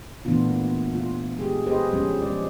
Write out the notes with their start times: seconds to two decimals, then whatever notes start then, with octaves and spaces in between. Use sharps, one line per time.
0.25 A#2 E3 A3 B3 D4 F4
0.95 F4
1.39 G#3 G4 G#4
1.66 G4 G#4 B4 C5 D#5
1.93 F3 G#3 C#4
2.22 F3 G#3 D5